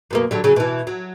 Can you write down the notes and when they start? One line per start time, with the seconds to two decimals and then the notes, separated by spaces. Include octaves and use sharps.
0.11 F#2 B2 A#3
0.31 D3 F#3 G3
0.44 C#3 F#3
0.56 B2 E3
0.87 F#3